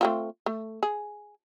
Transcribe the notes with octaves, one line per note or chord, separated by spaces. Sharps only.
A3 C4 F4
A3
G#4